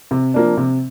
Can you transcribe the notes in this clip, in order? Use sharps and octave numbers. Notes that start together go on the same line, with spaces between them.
C3
F3 A#3 D4
C3